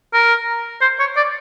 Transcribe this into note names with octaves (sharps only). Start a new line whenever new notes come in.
A#4
C5
C#5
D5